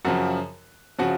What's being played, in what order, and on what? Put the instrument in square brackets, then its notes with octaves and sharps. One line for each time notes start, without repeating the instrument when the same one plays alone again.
[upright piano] F#2 C#3 F3 F#4
C#3 F3 F#4